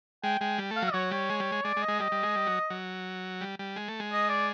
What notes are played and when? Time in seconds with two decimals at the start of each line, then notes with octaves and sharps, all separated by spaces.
0.23 G#3 G5
0.40 G#3 G5
0.58 G3
0.71 A3
0.76 F5
0.82 F#3
0.93 F#3 C#5
1.11 G3 C#5
1.30 G#3
1.40 G3
1.52 G#3
1.64 G#3 D5
1.76 G#3
1.82 D#5
1.88 G#3
2.00 G3 D#5
2.12 G3
2.23 G#3
2.35 G3
2.47 F#3
2.70 F#3
3.41 G3
3.59 G3
3.76 G#3
3.88 A3
4.00 G#3
4.12 D#5
4.29 D5